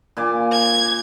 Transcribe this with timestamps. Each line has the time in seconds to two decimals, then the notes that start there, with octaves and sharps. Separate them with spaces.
0.17 A#2 G#5 D6
0.52 G#6